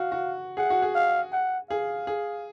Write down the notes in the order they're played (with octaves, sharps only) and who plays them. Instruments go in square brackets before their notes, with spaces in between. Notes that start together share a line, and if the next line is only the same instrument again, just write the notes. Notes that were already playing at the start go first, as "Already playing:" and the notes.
Already playing: [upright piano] F#4 [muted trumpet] F5
[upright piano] F#4
[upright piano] G#4 [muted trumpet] F#5
[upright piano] F#4
G#4
[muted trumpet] F5
F#5
[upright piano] G#4 [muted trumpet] F5
[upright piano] G#4